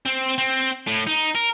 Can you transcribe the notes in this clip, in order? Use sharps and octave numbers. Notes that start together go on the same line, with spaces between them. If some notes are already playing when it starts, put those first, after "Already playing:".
C4
C4
A2
D#4
A#4